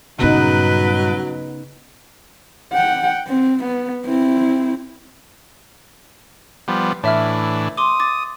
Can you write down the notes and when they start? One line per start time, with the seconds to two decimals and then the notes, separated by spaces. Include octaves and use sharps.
0.19 G2 A#2 C#3 F#3 B3 D#4 B4
2.73 F#5 G5
3.28 C4
3.64 B3
4.06 C4 E4
6.68 F3 G3 B3
7.04 A2 E3 D4 C#5 E5 F6
7.77 C6 D6 D#6
8.00 D6 A6